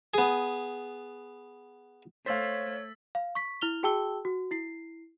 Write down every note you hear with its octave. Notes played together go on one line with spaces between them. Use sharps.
B3 G#4
A3 C5 C#5 F5 E6 A6 B6
F5
C#6 B6
E4 F6 F7 G7
F#4 G#4 G5 A5 E6 G7
F#4
E4 C7